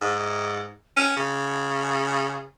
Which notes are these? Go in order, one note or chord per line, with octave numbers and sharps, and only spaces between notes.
G#2
C#4
C#3